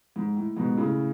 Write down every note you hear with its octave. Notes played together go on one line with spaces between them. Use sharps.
G#2
A2
G#2 B2
A2 C#3